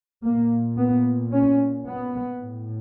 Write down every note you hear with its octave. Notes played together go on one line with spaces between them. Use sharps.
A#2 A#3
B3
C#4
B3
A2